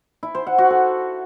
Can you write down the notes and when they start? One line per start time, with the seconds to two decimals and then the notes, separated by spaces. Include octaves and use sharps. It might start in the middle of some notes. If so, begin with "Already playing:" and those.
0.23 E4
0.35 C5
0.47 F#5
0.58 F#4
0.70 A4